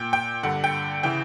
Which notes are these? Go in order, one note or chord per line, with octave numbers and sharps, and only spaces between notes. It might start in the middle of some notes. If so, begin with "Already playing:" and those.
Already playing: A#2 G5
G5
G2 D3 F#5
G5
C#3 E3 G5